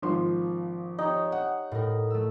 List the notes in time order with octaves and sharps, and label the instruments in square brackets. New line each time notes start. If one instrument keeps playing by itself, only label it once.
[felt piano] G#1 F3 C6
[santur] D#4 [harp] G4 C#5
[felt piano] F#5
[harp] A2 A#4
A3 E6